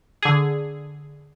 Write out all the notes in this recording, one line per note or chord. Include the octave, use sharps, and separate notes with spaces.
D3 G#4